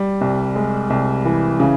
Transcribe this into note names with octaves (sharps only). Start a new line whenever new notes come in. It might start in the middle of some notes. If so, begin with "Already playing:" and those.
Already playing: G3
C2
G#3
C2
E3
C#3